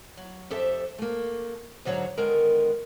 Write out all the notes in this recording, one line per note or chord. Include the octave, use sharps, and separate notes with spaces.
F#3
F2 G4 A4 C5 E5
A3 A#3
G#2 D3 F#3 F#4 C#5 A#5
D3 D#3 G#3 B3 A#4